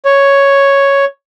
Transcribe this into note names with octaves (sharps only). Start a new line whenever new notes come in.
C#5